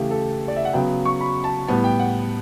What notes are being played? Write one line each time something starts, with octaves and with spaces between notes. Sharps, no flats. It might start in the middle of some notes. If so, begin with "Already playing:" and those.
Already playing: C#3 E3 A3 G4
A4
D5
E5
F#5
C#3 F#3 B3 G5
C#6
B5
A5
A2 G3 B3 A5
G5
F#5